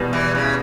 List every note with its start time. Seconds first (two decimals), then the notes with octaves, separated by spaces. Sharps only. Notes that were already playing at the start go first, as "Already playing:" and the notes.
Already playing: E2 B2 G3
0.13 E3
0.35 C#3